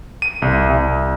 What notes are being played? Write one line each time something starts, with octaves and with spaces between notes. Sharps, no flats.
D#7
C2
C2